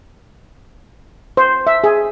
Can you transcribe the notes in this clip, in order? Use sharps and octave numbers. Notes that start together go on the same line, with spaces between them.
C5
E5
G#4